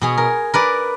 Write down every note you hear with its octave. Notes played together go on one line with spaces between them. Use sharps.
B2 G#4 C#5
A#4
A#4 B4 D5